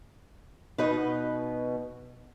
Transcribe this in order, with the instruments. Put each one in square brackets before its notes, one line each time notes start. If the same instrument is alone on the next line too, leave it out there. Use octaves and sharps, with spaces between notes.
[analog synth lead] B2 [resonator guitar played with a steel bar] D#4 B4